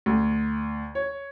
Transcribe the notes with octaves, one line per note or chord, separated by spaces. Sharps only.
D2
C#5